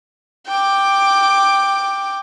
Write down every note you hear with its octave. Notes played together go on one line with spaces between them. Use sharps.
G5 D6